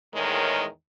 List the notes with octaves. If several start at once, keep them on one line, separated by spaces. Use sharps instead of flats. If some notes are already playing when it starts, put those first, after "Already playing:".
E2 A2 D#3 G#3 A#4 C#5